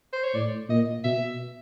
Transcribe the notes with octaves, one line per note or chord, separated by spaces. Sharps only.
C5
C#5
A2 D5
A#2 D#5
B2 E5